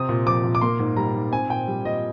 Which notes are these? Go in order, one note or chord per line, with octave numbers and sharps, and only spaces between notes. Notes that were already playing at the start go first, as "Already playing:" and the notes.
Already playing: C3 C4 D#6
A#2
F3 D6
A#2
D6
A#3 C6
G#2
G3 A#5
G#2
C4 G#5
A#2 G5
G3
A#2 D#5